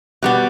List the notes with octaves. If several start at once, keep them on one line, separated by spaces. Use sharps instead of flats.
B2 G3 B3